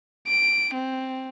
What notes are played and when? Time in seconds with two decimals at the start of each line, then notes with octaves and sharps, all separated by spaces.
0.28 D7
0.74 C4